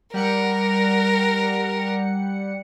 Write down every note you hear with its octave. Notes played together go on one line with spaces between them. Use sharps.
G3 A#4 F#5 C#7